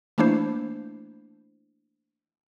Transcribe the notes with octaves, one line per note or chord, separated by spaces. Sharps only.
E3 A3 A#3 D4 E4 C5